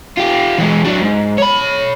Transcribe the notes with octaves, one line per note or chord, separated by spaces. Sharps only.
F4 G4
E3 G#3
F#3 D4
G#2
C#5 B5